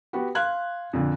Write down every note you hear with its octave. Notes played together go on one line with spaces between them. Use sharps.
B3 F#4 G4
F5 C6 F#6 G#6
F2 A#2 D3